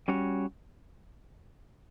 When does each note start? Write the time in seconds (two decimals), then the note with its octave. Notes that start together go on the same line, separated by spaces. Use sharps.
0.08 G3 C#4 F#4 C#5